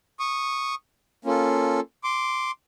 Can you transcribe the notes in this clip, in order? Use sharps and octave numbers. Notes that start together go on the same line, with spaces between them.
C#6 D#6
A#3 C#4 F4 A4
C6 D6